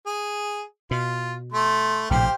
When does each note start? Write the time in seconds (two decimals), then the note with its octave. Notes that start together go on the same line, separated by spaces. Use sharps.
0.06 G#4
0.91 B2 F4
1.52 A3 C6
2.11 A#1 A2 C3 G4 C5 F5 G5